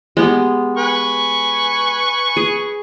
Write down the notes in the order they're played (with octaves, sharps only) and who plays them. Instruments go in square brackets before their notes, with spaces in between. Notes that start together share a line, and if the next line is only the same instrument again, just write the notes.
[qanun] G#3 B3 G4
[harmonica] B4 G#5 C#6
[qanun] G#4